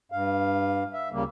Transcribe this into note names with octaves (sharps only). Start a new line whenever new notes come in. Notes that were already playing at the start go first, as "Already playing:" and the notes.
G2 F5
E5
D2 C#3 G3 A#3